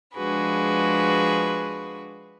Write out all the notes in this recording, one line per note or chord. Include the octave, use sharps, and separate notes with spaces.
F3 G#3 D4 F#4 G#4 B4